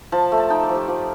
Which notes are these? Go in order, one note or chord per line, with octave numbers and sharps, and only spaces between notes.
F3 A5
A3
A5
D#4 G5
D5
F3
G4
F3 D5